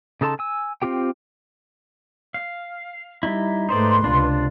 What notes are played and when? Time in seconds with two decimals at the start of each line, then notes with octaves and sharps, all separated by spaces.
0.21 C#3 D#4 A4 A5 C6
0.39 G#5 E6
0.82 C4 C#4 F4 G4 G5
2.34 F5
3.23 G3 D#4 E4
3.69 G#2 A3 D#4 B4 C5 D5 C6
4.04 C#2 C3 D4 F4